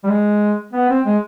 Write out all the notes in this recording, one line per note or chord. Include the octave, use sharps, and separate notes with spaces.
G3
G#3
B3
C4
G#3